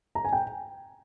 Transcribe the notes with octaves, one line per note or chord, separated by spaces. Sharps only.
A#5
G#5
G5